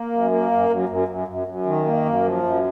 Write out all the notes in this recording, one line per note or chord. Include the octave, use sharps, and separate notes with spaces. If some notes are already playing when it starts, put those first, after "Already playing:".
Already playing: A#3
F#2
A#3
F#2
F#2
F#2
F#2
F#2
F#2
D#3
A#3
F#2
F3
F#2